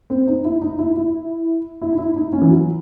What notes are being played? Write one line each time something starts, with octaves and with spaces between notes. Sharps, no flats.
C4
D#4
E4
D#4
E4
E4
E4
D#4
E4
D#4
C#4
E3
F#3